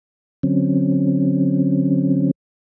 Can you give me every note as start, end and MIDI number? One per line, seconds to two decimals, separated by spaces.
0.43 2.31 50
0.43 2.31 54
0.43 2.31 60
0.43 2.31 61